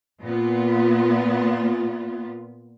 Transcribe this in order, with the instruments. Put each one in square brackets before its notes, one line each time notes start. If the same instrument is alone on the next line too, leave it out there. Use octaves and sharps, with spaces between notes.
[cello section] A#2 B3 F4